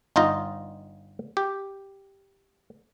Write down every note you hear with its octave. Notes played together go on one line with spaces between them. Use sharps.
G1 D#4 F4 D#5
G4